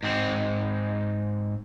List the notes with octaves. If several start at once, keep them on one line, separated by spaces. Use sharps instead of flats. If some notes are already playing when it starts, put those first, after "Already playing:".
G#2 C4